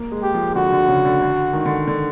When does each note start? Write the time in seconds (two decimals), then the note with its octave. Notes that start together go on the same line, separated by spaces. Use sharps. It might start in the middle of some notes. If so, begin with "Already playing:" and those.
Already playing: A#3
0.11 G#3
0.23 G4
0.34 F3
0.55 D3 F#4
0.72 D3
0.88 C#3
1.05 D3
1.22 D3
1.53 D#3
1.65 D3
1.87 D3